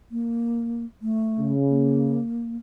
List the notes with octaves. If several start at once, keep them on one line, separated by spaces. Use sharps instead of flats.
A#3
A3
C#3
A#3